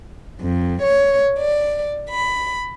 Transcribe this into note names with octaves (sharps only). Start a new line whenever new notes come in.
F2
C#5
D5
B5